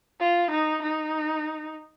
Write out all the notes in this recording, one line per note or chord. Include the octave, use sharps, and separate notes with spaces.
F4
D#4
D#4